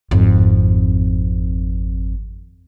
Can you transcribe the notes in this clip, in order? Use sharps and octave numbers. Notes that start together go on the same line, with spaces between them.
G#1 F2